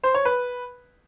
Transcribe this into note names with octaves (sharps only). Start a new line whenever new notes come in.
C5
C#5
B4